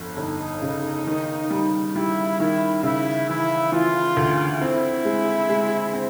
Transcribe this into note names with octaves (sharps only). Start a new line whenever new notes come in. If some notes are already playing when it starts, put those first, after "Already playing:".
Already playing: G1 F2
G1 D#4
C#3
D#3
G3
G3 E4
D#3 E4
C#3 E4
E3 E4
E3 F4
D2
C4 E4
G#3
G#3
C4